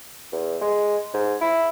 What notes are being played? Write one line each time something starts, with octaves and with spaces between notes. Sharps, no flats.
E2
G#3
G#2
E4